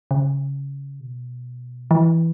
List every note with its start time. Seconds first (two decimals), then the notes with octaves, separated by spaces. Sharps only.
0.11 C#3
1.00 B2
1.91 E3